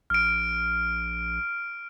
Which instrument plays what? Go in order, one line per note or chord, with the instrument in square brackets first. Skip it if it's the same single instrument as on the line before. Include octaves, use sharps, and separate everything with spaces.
[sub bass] A#1 [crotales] F6 D7